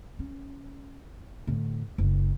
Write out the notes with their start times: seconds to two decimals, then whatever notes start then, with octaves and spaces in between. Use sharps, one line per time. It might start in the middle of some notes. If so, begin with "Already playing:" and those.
0.19 C#4
1.47 A2 D3
1.98 F#1